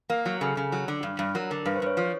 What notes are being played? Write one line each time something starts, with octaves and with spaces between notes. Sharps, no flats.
A#3 A#4
F#3
C#3 A4
C#3
F#3
D3
G2
G2
F#3 A#4
D3 A#4
G2 B4
C5
G2 C#5
F3